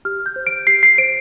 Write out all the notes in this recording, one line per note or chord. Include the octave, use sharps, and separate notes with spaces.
G4 F6
G6
C5
D7
G4 C7
C7
C5 D7